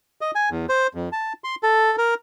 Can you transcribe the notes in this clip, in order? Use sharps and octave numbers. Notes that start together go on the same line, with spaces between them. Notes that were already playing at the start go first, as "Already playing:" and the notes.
D#5
G#5
E2
C5
F2
A5
C6
A4
A#4